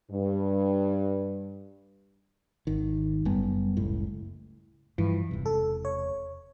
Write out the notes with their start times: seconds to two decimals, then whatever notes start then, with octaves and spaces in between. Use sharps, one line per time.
0.11 G2
2.67 G#1 D#3
3.25 F#1 F#2 G3 B3
3.77 F#1 C#2 A2
4.98 G2 E3 F3
5.31 E1 C3
5.46 A4
5.85 C#5